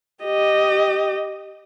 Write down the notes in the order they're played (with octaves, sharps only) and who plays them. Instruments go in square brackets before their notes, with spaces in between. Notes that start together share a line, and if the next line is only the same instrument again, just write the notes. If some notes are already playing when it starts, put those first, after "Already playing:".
[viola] G4 D#5